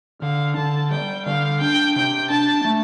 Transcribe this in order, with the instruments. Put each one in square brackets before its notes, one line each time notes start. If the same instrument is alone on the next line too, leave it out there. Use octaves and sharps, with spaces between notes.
[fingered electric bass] D3 [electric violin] F5
[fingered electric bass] D3 [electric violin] A5
[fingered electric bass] G3 [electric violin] G5
[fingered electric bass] D3 [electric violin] F5
[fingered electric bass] D4 [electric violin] G5
[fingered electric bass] C3 [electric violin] G5
[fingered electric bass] D4 [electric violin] A5
[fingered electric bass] A3